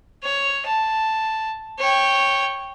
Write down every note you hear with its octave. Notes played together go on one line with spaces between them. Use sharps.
C#5
A5
C#5 G5